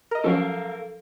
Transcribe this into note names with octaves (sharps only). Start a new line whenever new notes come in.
A#4 D#5
F3 F#3 C#4 A4 A#4 F5